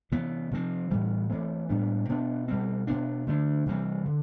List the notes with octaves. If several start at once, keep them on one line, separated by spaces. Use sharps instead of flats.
C3 E3 B3
C3 F3 C4
A2 E3 G3
E3 A3 C4
A2 G3 B3 D4
B2 B3 D4
B2 G3 C4
B2 B3 D4
D3 A3 D4
C3 E3 G3 C4
D3